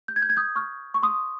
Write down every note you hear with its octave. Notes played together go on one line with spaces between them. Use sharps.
G6
G#6
G6
G#6
D#6 G6
C#6 F6
C#6
C6 D#6